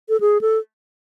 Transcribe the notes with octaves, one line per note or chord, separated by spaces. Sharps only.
A4
G#4
A4